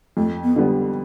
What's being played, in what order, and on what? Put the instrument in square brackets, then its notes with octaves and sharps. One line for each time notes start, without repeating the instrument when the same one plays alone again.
[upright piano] F2 [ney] A3
[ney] B3
[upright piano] D3 G3 B3